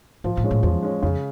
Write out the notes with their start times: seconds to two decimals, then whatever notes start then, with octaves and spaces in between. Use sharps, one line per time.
0.24 G#2 F3
0.37 A2
0.44 G#3 C#4
0.51 A2
0.63 E2 F3
0.82 G#3 C#4
1.02 F2 C#3